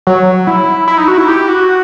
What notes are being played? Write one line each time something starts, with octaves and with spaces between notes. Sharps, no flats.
F#3
E4
E4
D#4
F#4
E4
G4
F#4